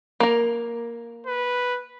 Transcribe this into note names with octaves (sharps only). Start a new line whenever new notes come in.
A#3 A#4
B4